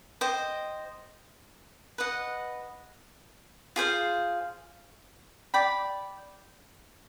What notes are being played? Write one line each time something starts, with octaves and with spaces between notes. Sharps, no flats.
C5 D#5 G5
B4 D#5 F#5
F4 G#4 C5 F5
D5 G5 B5